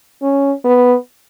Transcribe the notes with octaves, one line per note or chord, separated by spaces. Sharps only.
C#4
B3